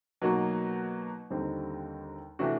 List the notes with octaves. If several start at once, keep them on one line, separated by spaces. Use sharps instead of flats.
B2 F#3 A#3 D#4 F#4
D#2 D3 G3 C4 D#4
C3 E3 A3 D4 F#4